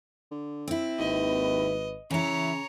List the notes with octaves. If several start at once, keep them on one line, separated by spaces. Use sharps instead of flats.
D3
C4 E4
G#1 D#2 B4 D#5
C#3 E3 E4 C#5 A#5